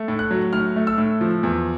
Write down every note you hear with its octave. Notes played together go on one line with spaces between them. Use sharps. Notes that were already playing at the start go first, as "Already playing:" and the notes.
Already playing: A3
A2
F#6
F#3
A2 F6
A3
E6
A2
F3
E2